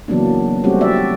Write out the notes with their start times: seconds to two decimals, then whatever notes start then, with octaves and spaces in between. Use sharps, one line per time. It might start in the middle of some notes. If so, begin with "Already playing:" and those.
0.08 C#3 E3 F#3 A#3 B3 D4
0.64 G3 A3 C4 C#4 F#4 G4
0.81 D5 E5